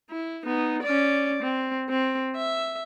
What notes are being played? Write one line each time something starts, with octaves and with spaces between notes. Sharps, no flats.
E4
B3 D#4
C#4 D5
C4
C4
E5